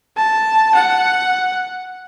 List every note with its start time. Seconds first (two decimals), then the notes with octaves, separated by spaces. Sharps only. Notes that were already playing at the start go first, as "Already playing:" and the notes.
0.17 A5
0.75 F#5